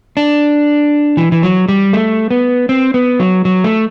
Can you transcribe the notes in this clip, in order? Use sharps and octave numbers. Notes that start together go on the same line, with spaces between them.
D4
E3
E3
F#3
G3
A3
B3
C4
B3
F#3
F#3
A3